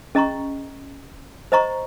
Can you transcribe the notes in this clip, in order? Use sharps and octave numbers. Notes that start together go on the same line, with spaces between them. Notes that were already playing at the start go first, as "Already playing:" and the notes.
C#4 G#4 D#5 A#5 C#6
C5 D#5 A#5 C#6